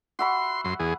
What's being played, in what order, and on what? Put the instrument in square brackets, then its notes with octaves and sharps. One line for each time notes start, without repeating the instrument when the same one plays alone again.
[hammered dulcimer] F#4 E5 B5 [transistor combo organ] C6
[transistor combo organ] F#2 C6
E2 G#4